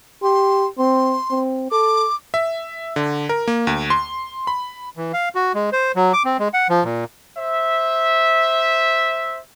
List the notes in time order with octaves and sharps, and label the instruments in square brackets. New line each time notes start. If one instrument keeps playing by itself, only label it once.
[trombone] G4 [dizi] C6
[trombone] C4 [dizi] C6
[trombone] C4
[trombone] A4 [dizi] D6
[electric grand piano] E5
D3
A#4
A#3
D2
C6
B5
[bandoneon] E3
F5
F#4
G#3
C5
F#3
D6
C4
G#3
F#5
F3
A#2
[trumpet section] C5 E5